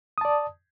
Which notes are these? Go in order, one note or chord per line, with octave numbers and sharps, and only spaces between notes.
D5 A5 D#6